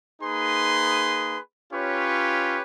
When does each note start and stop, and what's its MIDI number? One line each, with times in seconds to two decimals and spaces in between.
0.22 1.38 58
0.22 1.38 63
0.22 1.38 68
0.22 1.38 71
0.22 1.38 84
1.73 2.62 61
1.73 2.62 65
1.73 2.62 67
1.73 2.62 71
1.73 2.62 73